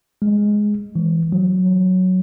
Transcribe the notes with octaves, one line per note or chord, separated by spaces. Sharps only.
G#3
E3
F#3